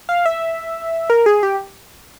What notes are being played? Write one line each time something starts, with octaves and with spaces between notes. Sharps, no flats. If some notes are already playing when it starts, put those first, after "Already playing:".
F5
E5
A#4
G#4
G4